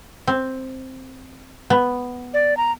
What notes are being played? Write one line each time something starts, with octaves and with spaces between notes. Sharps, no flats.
C4
B3
D5
A#5